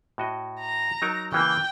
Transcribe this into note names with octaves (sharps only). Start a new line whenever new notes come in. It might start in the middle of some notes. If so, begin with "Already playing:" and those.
A2 F#4 D#5
A#5
F#3 D#4 A#4
C#3 E3 A#3 G5